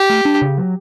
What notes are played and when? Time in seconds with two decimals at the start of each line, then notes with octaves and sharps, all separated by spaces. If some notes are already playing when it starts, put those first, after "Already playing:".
Already playing: G4
0.09 A3
0.25 D4
0.41 C#3
0.57 F#3